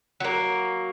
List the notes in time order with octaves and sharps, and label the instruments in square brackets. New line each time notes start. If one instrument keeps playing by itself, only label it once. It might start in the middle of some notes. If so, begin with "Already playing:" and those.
[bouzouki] F#3 A#3